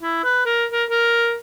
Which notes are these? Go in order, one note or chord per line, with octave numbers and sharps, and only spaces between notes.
E4
B4
A#4
A#4
A#4